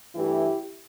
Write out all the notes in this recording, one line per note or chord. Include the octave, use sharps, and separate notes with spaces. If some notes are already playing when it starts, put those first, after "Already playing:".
G2 E3 A3 E4 G4